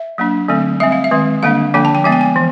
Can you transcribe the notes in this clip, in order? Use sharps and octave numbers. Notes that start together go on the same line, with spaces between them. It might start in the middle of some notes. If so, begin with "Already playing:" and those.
Already playing: E5
F#3 A#3 D4
D3 F#3 A3 C4
G3 C4 E5
F5
E5
D#3 G#3 C4
D3 G3 A#3 D4 F5
D3 F3 A#3 D4 G5
A5
G5
F3 G#3 B3 G#5
G5
G#5
E3